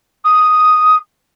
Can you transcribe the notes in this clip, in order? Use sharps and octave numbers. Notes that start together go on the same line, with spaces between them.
D#6